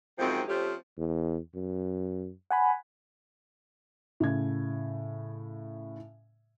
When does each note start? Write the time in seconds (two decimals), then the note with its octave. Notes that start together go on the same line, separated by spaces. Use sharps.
0.19 F#2 C3 F3 G#3 C4 D#4
0.48 F3 A3 C4 C#4 G4
0.98 E2
1.55 F#2
2.51 F#5 G#5 B5
4.20 A2 C#3 G#6